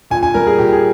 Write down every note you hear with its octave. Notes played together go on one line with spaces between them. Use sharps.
A#2 G#5
G#5
G3 A#4
G#4
A#2 G4
G#4